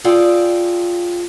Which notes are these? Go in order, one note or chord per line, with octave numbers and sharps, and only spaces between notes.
F4 G#4 A4 D5 F5 G5